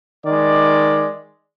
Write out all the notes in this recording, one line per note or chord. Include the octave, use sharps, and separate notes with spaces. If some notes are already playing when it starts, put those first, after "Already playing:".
D#3 G#3 D5